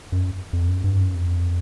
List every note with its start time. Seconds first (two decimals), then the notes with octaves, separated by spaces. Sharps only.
0.12 F#2
0.53 F2
0.68 F#2
0.84 G2
0.99 F#2
1.15 F2